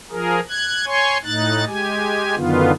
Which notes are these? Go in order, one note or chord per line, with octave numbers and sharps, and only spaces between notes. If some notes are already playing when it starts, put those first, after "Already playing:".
F3 G#4 A#4
F#6 G#6
C#5 G#5 C6 C#6
A2 D#4 F#6 A6
G#3 G4 G#5
F#2 D3 D#3 B3 F4